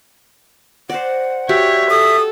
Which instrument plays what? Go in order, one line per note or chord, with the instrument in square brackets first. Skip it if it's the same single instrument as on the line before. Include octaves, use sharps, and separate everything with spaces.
[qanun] C5 D5 [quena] F#5
[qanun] F#4 G4 D5 [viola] C#5 [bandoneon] E5
[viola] A4 [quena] D#6